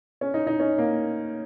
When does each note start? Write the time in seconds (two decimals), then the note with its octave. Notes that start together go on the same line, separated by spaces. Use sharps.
0.21 C#4
0.34 D#4
0.47 D#4
0.60 C#4
0.78 A#3